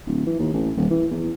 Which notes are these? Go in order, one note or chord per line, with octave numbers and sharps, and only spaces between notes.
D1
E3
D#2
A1
D#1
E3
E2